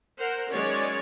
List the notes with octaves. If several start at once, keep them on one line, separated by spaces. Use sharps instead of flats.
A#4 C5 F#5
D#3 F#3 G#3 C#4 C#5 D5